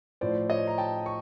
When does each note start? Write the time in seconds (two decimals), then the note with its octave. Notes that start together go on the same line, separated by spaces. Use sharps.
0.21 A2 F3 C5 D5
0.50 C#5 D#5
0.67 A#5
0.78 G5 A5
1.06 C#6